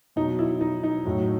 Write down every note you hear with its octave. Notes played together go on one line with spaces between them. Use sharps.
B2 F#3 D#4
E4
D#4
D#4
A2 F#3